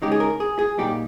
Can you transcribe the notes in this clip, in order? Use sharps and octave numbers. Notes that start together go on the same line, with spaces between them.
C#3 G#3 D#4 G4
G#4
A#4
G#4
G#4
A#2 G3 A#3 D#4 G4